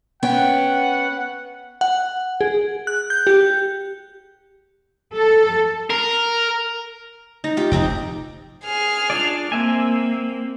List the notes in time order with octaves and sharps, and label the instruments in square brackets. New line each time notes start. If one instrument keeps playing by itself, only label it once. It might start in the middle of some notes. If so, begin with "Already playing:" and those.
[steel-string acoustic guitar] B3 C#4 G5 [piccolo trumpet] F#5
[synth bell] F#5
G#4
F#6
G6
G4
[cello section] A4
[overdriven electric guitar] A#4
[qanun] D#4
F4 G4
[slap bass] F1 [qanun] C4 D#4 G5
[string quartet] G#4 F6
[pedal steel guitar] D4 F4 D5
[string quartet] A#3 [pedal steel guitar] C4 E5 G#5